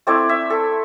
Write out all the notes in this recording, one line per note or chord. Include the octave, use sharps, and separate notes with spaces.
A3 C4 E4 D5
E5
A4